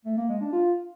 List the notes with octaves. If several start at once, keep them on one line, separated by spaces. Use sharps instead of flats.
A3
A#3
G#3
D4
F4